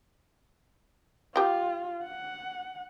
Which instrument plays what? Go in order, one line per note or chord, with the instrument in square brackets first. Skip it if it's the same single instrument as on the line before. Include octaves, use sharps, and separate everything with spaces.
[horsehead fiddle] F4 [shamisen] G4 G5
[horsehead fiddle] F#5